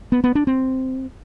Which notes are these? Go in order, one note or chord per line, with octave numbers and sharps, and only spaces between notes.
B3
B3
D4
C4